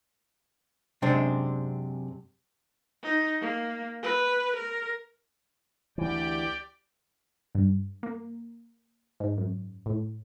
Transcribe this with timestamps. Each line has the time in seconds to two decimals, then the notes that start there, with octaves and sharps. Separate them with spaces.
1.02 F#2 C3 G#3 C4 D4
3.03 D#4
3.41 A#3
4.03 B4
4.56 A#4
5.98 D2 E3 G4 D5 G5
7.55 G2
8.03 A#3
9.20 G#2
9.38 F#2
9.86 A2